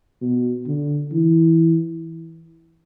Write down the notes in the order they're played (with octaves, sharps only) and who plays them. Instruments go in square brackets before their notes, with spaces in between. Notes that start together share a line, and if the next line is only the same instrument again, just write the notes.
[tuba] B2
D3
E3